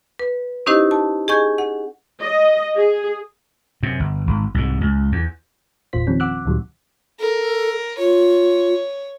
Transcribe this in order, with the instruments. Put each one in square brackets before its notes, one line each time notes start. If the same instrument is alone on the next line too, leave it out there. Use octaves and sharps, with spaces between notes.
[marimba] B4
C#4 D#4 E4 G4 C5 D#5
A5
G#4 D#5 G#5 C#6 G6 G#6
F#5
[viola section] D#5
G#4
[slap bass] F#2 C3
G1
G#1
C2 G#2
C#2
E2
[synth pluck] G1 E2 A#2 F4 C5 B6
D#3 F3 G3 C4 C#4
F#5 D6 E6 F#6
D2 A#2 D#3 F#3 G3
[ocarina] A4 [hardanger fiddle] A#4
[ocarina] F4 [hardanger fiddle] C#5